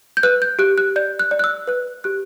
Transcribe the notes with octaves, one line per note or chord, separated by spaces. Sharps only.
G6
B4 F#6
G6
G4 F#6
F#6
D5 G6
F#6
D5
F#6
E6
B4 F#6
G4 F#6